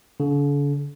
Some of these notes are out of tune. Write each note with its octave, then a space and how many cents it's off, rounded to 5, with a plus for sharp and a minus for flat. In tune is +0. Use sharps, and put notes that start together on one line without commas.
D3 -45